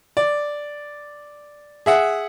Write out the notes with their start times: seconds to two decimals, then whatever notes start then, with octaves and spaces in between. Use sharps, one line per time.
0.17 D5
1.86 G#4 E5 F#5